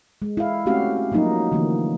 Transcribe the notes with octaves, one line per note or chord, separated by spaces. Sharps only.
G#3
E4 F5
A3 C4 C#4 F#4 G4 F5
F3 F#3 A#3 D#4
D3 E3 F3 A3 A#3